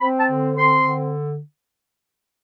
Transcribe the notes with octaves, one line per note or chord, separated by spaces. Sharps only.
C4 B5
A5
D3
C4 C6
D3